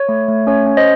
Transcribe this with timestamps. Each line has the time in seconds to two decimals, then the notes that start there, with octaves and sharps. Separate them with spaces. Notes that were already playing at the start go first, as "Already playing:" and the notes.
Already playing: C#5
0.09 A3
0.28 A3
0.47 C#4 C#5
0.66 C#4
0.77 C5 D#5